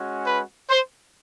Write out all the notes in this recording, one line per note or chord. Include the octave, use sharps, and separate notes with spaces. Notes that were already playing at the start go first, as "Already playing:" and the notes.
Already playing: G#3 C#4 F#4
B4
C5